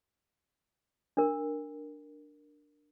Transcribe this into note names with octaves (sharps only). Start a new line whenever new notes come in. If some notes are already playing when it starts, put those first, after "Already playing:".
D4 A#4